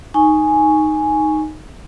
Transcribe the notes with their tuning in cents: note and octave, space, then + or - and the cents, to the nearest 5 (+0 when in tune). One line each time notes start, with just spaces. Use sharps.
D#4 +0 G#5 +0 C#6 +0